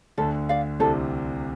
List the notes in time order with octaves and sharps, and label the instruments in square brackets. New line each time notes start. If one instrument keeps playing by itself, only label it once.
[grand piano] D2 D3 [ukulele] A4
[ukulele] D5 F5
[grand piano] C2 C3 [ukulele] A4